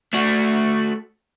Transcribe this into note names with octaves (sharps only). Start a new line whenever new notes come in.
A3 F#4